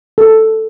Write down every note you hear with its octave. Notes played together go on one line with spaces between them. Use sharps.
A4